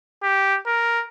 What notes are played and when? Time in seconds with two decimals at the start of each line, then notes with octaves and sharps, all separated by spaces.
0.23 G4
0.67 A#4